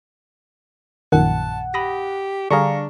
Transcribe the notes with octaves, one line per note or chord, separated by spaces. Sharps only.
A#1 F#2 A#2 D#3 F#5 A5
G4 B5 D#6 A#6
D3 G3 D4 G#4 F5 A#5 C#6